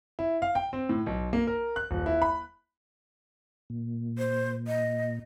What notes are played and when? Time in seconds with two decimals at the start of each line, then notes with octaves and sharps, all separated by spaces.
0.19 E4
0.42 F5
0.55 G5
0.73 C4
0.89 A2
1.06 B1
1.33 A#3
1.47 A#4
1.76 F#6
1.91 D#1
2.06 E4
2.22 B5
3.70 A#2
4.18 C5
4.67 D#5